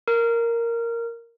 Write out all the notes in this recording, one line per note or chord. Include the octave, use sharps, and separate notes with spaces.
A#4